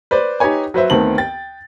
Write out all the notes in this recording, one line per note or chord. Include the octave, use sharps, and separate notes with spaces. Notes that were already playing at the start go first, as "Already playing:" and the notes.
B4 C5 D5
D#4 G4 B4 C#5 G#5
F#3 B4 C5 E5
D2 D#3 B3 C4 A5 F#7
G5 A6